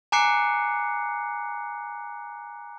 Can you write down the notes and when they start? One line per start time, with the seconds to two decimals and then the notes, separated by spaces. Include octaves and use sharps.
0.12 G#5 A#5 D6 F#6 C7 C#7